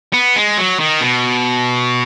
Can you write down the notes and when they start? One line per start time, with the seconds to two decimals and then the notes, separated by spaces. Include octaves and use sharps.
0.13 B3
0.36 G#3
0.57 F#3
0.80 D#3
1.01 B2